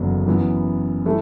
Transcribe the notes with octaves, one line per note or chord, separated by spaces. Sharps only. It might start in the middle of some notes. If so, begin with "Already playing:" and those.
Already playing: F#1 E2 D3 F#3 B3
F#2 E3 B3
E3 A3 E4